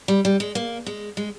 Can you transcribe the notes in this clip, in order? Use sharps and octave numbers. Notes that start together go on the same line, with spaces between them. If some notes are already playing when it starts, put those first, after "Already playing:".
G3
G3
G#3
A#3
G#3
G#3